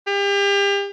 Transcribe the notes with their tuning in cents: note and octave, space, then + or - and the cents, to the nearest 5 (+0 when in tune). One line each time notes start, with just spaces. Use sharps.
G4 +35